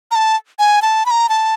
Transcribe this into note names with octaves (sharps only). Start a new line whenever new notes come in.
A#5
A5
G#5
A5
B5
A#5
A5